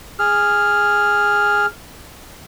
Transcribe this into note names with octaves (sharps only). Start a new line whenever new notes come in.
G#4 F6